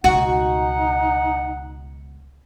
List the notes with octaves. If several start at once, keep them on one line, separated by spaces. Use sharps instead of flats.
C#2 B2 D#4 F#4 F#5